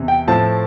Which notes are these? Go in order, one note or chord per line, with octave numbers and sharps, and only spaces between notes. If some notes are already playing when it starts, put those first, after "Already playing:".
Already playing: E2 C3 E3
G5
A2 F3 A3 C4 A5